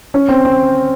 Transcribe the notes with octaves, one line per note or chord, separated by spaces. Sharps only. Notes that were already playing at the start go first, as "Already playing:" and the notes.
C#4
C4
C4